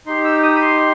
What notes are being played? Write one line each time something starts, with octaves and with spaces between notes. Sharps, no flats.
D#4 G4 C6
E6
D#6
B5
C6